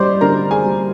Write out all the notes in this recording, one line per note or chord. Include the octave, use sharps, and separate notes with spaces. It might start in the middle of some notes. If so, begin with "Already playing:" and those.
Already playing: G3 C5 D5 D#5 C6 D6
D3 A#4 A#5
G#4 G#5
G3